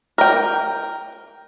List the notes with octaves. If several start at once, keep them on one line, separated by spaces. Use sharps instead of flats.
A#4 G5